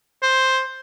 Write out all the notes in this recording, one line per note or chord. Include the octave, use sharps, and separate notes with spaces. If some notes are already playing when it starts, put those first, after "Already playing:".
C5